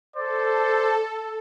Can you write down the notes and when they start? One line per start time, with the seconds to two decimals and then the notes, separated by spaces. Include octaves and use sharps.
0.15 A4 C5 D5